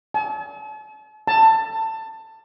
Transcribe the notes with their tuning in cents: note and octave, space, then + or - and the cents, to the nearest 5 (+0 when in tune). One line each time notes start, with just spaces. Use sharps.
A5 -45
A5 +20